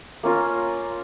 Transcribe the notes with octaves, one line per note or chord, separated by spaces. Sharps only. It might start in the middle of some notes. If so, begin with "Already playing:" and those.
A#3 C#4 F4 A#4